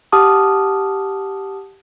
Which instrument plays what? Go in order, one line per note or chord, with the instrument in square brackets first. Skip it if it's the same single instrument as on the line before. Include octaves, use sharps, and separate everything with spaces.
[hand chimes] G4 F#5 A5 D6 D#6 F6